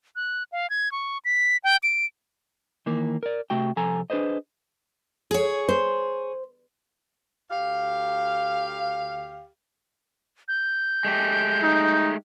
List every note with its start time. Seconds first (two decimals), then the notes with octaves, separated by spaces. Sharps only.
0.16 F#6
0.52 F5
0.70 G#6
0.92 C#6
1.25 B6
1.64 G5
1.83 D7
2.86 D#3 E3 A#3
3.23 A#4 D5
3.50 C3 A3 F#4 G5
3.77 C2 F3 A4 G#5 A#5
4.10 D4 G#4 B4 C5 D#5
5.31 G#4 C#5
5.69 C5
7.51 D2 G4 F5
10.48 G6
11.05 G#3 A3 G4
11.63 D#4